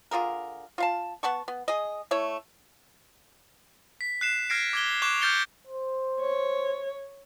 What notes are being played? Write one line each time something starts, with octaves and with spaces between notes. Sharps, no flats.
D3 F4 G#4 A#4
F4 F5 A5
B3 F#5 A5 C#6
B3
G#4 D#5
A3 E4 C#5
B6
F#6 C7 E7
F6 G#6 A#6 C7 D7
D6 G#6 G7
C#6 D6 F#6 E7 F7
F6 G6 A6 C#7 G7
C5
C#5